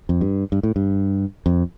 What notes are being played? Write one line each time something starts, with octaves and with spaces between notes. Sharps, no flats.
F2
G2
G2
A2
G2
F2